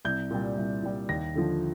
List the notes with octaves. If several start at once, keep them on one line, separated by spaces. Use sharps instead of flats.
C2 G6
A#2 G3
C2
A#2 G3
D#2 A#6
D3 F3